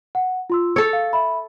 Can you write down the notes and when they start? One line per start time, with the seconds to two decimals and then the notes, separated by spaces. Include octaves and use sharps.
0.15 F#5
0.50 F4 C6 E6
0.76 A4 C#5 E6
0.93 F5
1.13 E5 B5